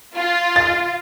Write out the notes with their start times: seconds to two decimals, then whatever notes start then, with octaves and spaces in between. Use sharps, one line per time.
0.15 F4
0.56 A6